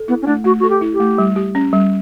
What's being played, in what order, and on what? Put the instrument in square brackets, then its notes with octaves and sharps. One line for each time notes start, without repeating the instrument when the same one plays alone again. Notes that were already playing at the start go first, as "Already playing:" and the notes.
Already playing: [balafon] A4
[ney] B3 [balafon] E4
[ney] C#4
[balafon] A3 [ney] D4
[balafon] A3 [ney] F#4
[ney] F#4 [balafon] A4
[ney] G4
[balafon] E4
[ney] G4
[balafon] A3
G3
G4
C#4
G3